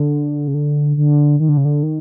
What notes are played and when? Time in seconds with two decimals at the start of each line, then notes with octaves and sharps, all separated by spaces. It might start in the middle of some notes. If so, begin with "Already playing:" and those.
Already playing: D3
0.48 C#3
0.54 D3
0.97 D3
1.40 D#3
1.49 D3
1.57 C#3
1.65 D3
1.83 D#3